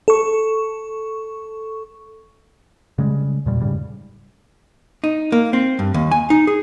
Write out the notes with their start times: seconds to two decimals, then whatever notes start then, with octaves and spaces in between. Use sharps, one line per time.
0.08 A4 C#6
2.98 C#3 G3 G#3
3.46 E2 A#2 G3
3.61 G#2 C#3 G3
5.04 D#4
5.32 A#3
5.53 C4
5.79 G2
5.94 D#2
6.12 G#5
6.30 D#4
6.47 G#4